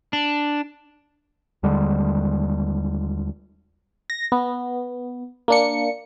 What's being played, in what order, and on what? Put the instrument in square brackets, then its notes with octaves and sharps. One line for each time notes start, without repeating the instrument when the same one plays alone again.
[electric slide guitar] D4
[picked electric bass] D#2 D3 G3 G#3
[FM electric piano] A#6
B3
A#3 D4 C#7